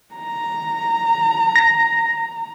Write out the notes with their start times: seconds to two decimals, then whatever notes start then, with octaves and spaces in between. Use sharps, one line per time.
0.15 A#5
1.56 A#6